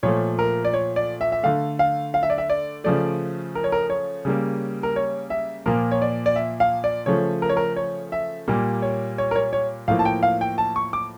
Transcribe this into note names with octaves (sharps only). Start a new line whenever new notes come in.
A#2 F3 A3 C#5
A#4
D5
C#5
D5
E5
E5
D3 A3 F5
F5
F5
E5
D5
E5
D5
C#3 F3 A3 D5
A#4
C#5
A#4
C#5
C#3 G3 A#3
A#4
C#5
E5
A#2 F3 A#3 A#4
C#5
D5
D5
E5
F5
D5
C#3 F3 A3 C#5
A#4
C#5
A#4
C#5
E5
A#2 G3 A#3
C#5
C#5
A#4
C#5
C#5
A2 F3 A#3 F5
A5
G5
F5
G5
A5
C#6
D6